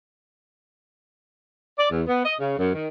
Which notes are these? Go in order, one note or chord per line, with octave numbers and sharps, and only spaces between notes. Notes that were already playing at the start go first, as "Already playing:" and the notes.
D5
E2
B3
D#5
C#3
F#2
D#3